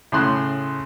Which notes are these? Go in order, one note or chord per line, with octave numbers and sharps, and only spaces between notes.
A2 C#3 C6 F#6